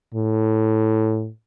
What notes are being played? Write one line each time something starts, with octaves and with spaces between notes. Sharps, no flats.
A2